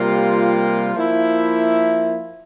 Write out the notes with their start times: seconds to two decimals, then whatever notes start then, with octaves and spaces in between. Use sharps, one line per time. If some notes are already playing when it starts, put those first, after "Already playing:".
Already playing: C3 G3 A#3 F4
0.95 F3 A#3 E4